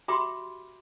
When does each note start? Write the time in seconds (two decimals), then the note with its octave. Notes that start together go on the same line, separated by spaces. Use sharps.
0.08 F#4 G4 E5 B5 C6 D6